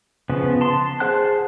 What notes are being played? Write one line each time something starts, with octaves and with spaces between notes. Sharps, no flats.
C#3 F3 B3
A5 C6
G#4 C5 F#5 A5 F#6